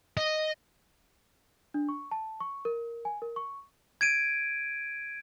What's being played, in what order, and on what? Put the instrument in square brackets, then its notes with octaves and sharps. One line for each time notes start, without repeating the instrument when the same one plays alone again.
[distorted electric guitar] D#5
[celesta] D4
C#6
A5
C#6
A#4
G#5
A#4
C#6
[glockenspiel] G#6 D7 D#7